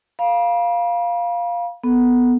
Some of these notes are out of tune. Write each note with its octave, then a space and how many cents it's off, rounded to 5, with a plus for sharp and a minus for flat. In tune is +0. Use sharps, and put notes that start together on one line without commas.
F5 +0 B5 -45
B3 +0 A4 +0